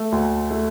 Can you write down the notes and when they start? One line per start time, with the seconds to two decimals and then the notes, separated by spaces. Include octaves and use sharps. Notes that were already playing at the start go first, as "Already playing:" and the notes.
Already playing: A3
0.12 D2
0.51 A3